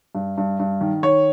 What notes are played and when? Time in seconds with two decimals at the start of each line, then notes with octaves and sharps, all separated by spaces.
0.15 G2
0.38 G2
0.60 G2
0.81 D#3
1.03 D#3 C#5